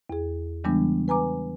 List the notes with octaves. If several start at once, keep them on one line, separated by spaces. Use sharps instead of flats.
E2 G#4
C#3 E3 G3 G#3 B3 D4
B4 G#5 A#5 D6